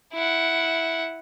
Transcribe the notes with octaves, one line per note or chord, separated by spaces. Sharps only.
E4 F#5